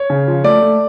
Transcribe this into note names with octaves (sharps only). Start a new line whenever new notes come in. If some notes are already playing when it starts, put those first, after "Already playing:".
Already playing: C#5
C#3
F3
A3 D5
A3